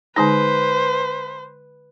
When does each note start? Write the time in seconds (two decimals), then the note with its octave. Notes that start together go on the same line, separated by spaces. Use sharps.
0.16 D3 G#3 D#4 B4 C5